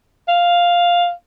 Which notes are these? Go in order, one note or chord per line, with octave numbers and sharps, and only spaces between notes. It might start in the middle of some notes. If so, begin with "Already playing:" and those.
F5